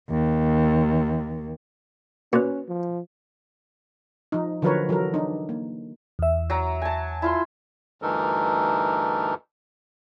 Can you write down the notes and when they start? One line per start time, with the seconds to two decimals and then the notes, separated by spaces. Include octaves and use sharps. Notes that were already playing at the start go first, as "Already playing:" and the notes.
0.10 D#2
2.33 A#2 C#4 F#4 B4
2.68 F3
4.32 F3 D#4
4.62 D3 F3 F#3 A#4 B4 C#5
4.89 E3 F#3 A4 A#4
5.14 D4 D#4
5.49 A#3
6.19 E2 E5
6.50 F#3 A#5
6.82 G#5 A5
7.22 E4 F4 C6
8.02 D2 G2 E3 D#4 A4 A#4